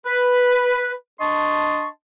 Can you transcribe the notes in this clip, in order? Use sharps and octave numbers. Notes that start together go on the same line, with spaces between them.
B4
D4 D#5 A5 C6 C#6